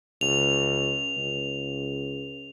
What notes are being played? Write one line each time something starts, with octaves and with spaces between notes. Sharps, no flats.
C#2 F7
C#2